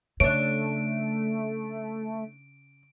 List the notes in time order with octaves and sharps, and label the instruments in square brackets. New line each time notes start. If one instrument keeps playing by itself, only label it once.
[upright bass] C#3 [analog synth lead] A3 [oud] D4 C#5 [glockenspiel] D7